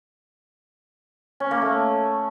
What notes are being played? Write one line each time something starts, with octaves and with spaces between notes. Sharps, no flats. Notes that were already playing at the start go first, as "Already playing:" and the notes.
C#4
A#3
A3